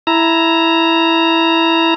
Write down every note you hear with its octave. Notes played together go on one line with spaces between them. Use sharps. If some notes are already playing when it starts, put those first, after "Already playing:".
E4 A#5